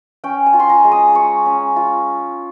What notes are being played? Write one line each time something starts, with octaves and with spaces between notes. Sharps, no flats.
C#4 G5
G#5
F4
C6
A#5
G#3
D#6
D#6
G#3 C#6
C#4
F4